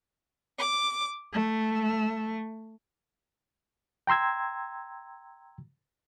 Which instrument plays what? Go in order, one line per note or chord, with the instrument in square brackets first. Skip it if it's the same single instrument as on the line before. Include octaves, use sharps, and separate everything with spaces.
[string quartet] D6
A3
[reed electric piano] G5 A#5 C6 E6 G#6